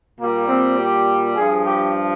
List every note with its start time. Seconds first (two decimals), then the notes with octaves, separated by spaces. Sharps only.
0.19 A#2 G3 A#3
0.48 C4
0.78 G4
1.36 G2 F3 G#4
1.66 G4